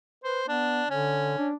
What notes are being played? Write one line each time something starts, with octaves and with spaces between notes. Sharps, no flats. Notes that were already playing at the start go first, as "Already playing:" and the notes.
B4 C5
B3 D4
D3 C#4
D4